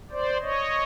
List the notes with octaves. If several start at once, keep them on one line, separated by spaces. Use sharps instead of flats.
C5 D5
C#5 D#5